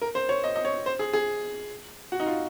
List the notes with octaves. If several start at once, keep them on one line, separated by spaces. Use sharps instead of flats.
A#4
C5
C#5
D#5
D#5
C#5
C5
G#4
G#4
F#4
D#4
F4